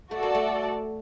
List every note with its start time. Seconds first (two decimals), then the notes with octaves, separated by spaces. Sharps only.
0.11 A3 F#4 A4 D5
0.23 A#3
0.35 A3